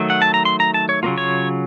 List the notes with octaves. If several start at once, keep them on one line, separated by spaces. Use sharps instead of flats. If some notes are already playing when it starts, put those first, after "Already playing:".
Already playing: D#3 F#3 A3
F#5
A5
A#5
C6
A#5
A5
C#5
C#3 F#3 A#3 F4
C#5